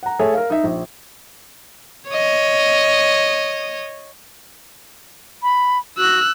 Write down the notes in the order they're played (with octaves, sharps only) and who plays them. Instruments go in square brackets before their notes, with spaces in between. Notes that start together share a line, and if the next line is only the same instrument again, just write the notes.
[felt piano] F#5 A#5
A3 G#4 A4 C#5 E5
A#4 F5
D#4 E5
A#1
[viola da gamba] C#5 D#5
[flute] B5
[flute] F#4 [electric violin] E6 F#6